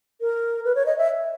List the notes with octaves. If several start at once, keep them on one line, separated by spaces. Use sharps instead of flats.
A#4
B4
C#5
D#5
E5